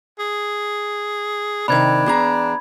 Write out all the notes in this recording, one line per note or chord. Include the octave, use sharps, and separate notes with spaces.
G#4
C3 D#3 D4 B5 G#6
E2 G#4 A#5